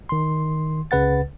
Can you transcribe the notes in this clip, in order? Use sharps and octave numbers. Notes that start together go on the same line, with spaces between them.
D#3 C6
C#2 C#3 B4 F#5 A6